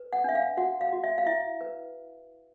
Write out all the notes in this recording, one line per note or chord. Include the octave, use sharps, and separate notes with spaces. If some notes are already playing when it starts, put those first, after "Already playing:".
Already playing: B4
F#5
D4 E5
F5
F#4 F#5
F5
F#4
E5
F5
E4 E5
B4